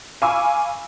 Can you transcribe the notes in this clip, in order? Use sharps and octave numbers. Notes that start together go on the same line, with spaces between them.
F5 G#5 B5 C#6 D6 E6